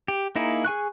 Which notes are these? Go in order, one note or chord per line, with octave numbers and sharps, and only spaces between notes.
G4
A#3 D#4 E4 G#4
G#4 G#5 C#6 F#6